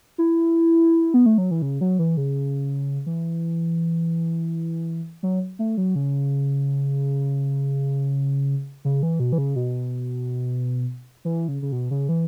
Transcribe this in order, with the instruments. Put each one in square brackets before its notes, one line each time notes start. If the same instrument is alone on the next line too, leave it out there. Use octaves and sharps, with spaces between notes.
[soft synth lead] E4
B3
A3
F#3
E3
C#3
F#3
E3
C#3
E3
F#3
A3
F#3
C#3
C#3
E3
B2
E3
C#3
B2
E3
C#3
C#3
B2
C#3
E3